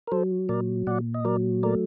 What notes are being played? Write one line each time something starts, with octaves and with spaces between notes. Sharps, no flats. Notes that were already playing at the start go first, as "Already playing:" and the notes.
A#4
F#3 A4 C5
A#2 A#4 D5
A#2 D5 F#5
D#5
F#3 A#4 D5
A3 A#4 D5